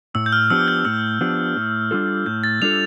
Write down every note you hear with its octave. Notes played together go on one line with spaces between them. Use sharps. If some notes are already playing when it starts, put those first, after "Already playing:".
A2 E6
G6
F6
F3 B3 D4 G4 E6
G6
A2 E6
F3 B3 D4 G4
A2
G3 D4 F4 A4
A2 G6
A6
G3 D4 F4 A4 F7